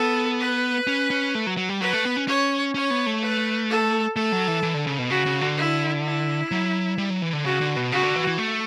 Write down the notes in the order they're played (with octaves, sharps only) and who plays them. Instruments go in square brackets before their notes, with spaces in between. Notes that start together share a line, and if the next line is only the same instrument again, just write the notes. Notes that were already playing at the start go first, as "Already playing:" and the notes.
Already playing: [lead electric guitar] B3 [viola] A4
[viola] B4
[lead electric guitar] C#4
C#4
A3
F#3
F#3
G3
[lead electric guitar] F#3 [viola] B4
[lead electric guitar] A3
B3
C#4
[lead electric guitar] C#4 [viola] C#5
[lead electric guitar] C#4 [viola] C#5
[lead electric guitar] B3
A3
[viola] B4
A4
[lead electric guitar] A3 [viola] A4
[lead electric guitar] F#3
E3
E3
D3
C#3
B2
[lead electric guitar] C#3 [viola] F#4
[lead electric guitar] C#3
D3
[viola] E4
E4
[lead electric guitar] F#3
G3
F#3
E3
D3
[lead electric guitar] C#3 [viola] F#4
[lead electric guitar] D3
B2
[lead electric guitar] C#3 [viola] F#4
[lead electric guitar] D3
E3
E3
A3